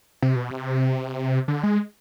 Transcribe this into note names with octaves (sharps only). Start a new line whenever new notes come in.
C3
B2
C3
D3
G#3